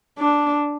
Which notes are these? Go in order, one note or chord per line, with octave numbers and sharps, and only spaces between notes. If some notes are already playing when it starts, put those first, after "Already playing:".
D4